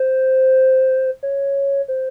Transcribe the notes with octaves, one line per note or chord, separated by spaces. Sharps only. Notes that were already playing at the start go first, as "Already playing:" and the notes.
Already playing: C5
C#5
C5